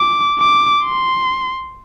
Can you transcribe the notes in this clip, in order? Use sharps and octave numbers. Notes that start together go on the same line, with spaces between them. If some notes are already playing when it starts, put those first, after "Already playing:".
Already playing: D6
D6
C6